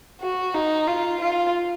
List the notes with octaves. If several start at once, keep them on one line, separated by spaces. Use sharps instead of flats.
F#4
D#4
F4
F4